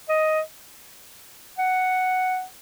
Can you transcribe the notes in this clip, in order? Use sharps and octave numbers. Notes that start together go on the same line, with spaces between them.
D#5
F#5